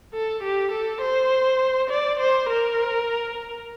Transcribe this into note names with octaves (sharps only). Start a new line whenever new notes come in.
A4
G4
A4
C5
D5
C5
A#4